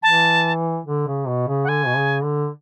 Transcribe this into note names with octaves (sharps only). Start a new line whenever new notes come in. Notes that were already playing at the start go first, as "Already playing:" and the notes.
E3 A5
D3
C#3
B2
C#3
F#5
D3 G#5
B2
C#3
D3